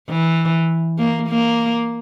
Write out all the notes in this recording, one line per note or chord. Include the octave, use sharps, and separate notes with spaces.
E3
A#3
A#3